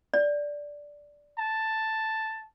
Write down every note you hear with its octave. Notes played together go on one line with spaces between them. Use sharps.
D5
A5